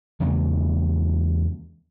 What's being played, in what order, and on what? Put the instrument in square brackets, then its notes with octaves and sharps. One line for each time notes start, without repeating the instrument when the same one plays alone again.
[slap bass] E2 C#3 G#3 A#3